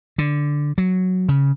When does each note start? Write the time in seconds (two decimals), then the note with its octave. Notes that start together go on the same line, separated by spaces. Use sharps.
0.18 D3
0.78 F#3
1.29 C#3